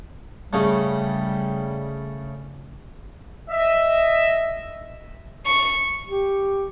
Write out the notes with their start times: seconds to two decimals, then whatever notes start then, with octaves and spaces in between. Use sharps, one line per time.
0.53 C#3 G3 A3
3.50 D#5 E5
5.46 C#6
6.09 G4